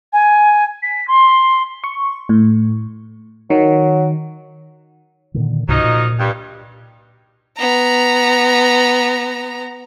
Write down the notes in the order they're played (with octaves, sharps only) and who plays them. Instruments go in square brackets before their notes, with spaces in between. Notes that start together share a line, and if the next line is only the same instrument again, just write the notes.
[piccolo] G#5
B6
C6
[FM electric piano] C#6
A2
[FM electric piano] D#3 [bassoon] F#3
[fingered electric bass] A#2 D3 D#3
[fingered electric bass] C#2 G#2 C3 [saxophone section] F3 F#3 D#4
[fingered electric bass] A#2
[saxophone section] G2 G3
[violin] B3 A#5